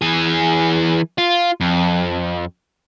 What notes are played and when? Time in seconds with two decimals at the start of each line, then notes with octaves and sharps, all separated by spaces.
0.02 E3 G#4
1.18 F4
1.61 F2